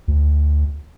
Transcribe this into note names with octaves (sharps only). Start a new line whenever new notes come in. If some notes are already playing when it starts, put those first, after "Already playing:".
D2